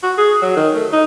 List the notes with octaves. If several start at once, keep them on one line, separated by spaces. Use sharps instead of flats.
F#4
G#4
F#3
D#3
A3
D#4